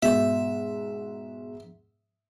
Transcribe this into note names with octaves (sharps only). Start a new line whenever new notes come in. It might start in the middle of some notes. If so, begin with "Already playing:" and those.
G#2 B2 E5